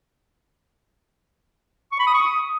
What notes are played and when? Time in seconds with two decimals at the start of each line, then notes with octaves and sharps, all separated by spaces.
1.92 C#6
1.99 B5
2.07 D#6
2.14 C#6
2.22 D#6